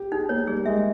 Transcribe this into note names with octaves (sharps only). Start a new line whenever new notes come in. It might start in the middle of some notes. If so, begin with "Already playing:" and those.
Already playing: G4
D#4 G#4
A#3 C#5
G3 G#4
G#3 E5